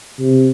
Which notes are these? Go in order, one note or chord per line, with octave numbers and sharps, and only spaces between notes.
C3